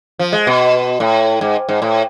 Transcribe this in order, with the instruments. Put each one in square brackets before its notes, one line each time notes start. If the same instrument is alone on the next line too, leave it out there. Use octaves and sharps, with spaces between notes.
[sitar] F3
G#3
B2
A2
G#2
G#2
A2